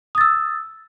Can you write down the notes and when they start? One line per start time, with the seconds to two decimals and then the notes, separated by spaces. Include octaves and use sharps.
0.15 D#6
0.18 A6
0.21 E6